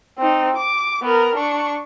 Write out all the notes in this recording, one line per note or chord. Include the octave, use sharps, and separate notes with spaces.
C4 D#4
D6
B3 A#4
D4 C#6